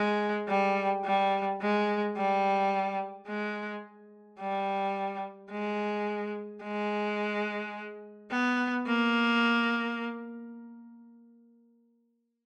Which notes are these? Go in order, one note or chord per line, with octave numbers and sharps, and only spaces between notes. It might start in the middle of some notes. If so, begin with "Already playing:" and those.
Already playing: G#3
G3
G3
G#3
G3
G#3
G3
G#3
G#3
B3
A#3